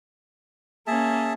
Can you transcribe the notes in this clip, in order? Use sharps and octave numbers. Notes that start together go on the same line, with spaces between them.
A#3 C#4 G#4 E5 A5